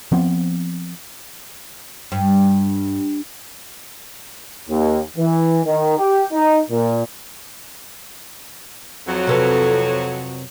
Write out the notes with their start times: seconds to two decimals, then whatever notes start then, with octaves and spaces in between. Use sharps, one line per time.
0.12 F3 B3 C4
2.12 G2
4.68 D#2
5.16 E3
5.65 D#3
5.97 G4
6.32 D#4
6.70 A#2
9.07 F2 F#3
9.27 C3 A4 B4